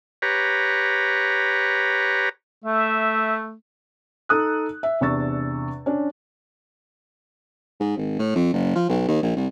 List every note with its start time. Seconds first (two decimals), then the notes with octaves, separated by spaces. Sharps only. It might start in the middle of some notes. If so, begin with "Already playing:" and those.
0.22 G4 B4 C#5 A#5
2.65 A3 E5
4.29 D#4 A4 D#6 F#6
4.83 E5
5.01 E2 C3 D4 C#6 E6 A6
5.86 C#4 D4
7.80 G#2
7.97 G#1
8.19 A2
8.35 F2
8.53 F#1
8.75 F3
8.89 B1
9.08 D#2
9.23 A#1
9.36 C2